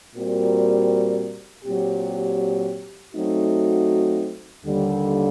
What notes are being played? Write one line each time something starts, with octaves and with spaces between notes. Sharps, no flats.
A#2 G3 C4 F#4 A#4
A#2 F#3 C4 G4
F#3 A3 C4 D#4 F#4
D#2 D3 G3